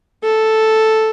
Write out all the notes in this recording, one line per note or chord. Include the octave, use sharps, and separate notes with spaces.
A4